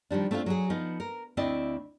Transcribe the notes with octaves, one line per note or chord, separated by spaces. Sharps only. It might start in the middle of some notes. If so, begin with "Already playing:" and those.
D#3 F3 G3 D4
A3 C4 D4 D#4 F4
F#3 F#4 G#4
F3 B3 D#4
A#4
D2 C4 E4 D5 D#5